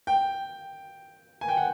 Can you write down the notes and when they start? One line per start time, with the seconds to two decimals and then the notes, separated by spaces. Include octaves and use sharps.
0.07 G5
1.41 G#5
1.48 G5
1.57 F#5